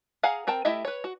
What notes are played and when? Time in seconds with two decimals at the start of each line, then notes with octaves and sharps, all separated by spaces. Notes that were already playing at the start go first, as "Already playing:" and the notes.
0.23 G#4 F5 F#5 G#5 A#5
0.47 C4 A#4 G5 A5
0.65 A3 E4 G4 D#5 E5
0.85 B4 C#5
1.04 F#4